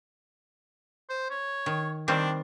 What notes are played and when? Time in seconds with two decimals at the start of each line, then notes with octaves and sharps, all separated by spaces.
1.10 C5
1.30 C#5
1.66 D#3
2.08 D#3 G3 C4 D4